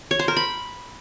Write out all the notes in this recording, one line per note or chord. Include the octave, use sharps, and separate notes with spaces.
C#5
C5
A#4
B5